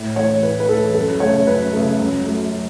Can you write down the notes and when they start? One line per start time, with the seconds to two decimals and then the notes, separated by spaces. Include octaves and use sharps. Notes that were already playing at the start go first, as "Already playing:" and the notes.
Already playing: A2
0.16 E3 A3 C#5
0.43 A2 B4
0.60 B4
0.69 E3 A3 A4
0.94 F#2 A4
1.20 C#3 A3 C#5
1.46 F#2 B4
1.73 C#3 A3
1.99 F#2
2.25 F#3 A3